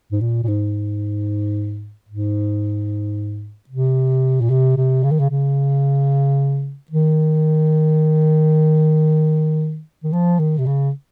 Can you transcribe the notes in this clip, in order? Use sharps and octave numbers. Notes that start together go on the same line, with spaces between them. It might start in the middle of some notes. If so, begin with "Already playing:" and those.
G#2
A#2
A#2
G#2
G#2
C3
A#2
C3
C3
C#3
D#3
C#3
C#3
D#3
D#3
F3
D#3
C3
C#3